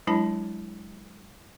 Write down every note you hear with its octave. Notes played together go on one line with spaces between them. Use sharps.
F#3 G#3 D4 E4 A5 B5